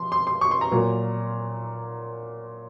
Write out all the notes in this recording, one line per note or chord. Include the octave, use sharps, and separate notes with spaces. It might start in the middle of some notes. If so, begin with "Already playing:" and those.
Already playing: F3 C6
C6
C6
C#6
C6
A#5
A#2 F#3 A#3 F4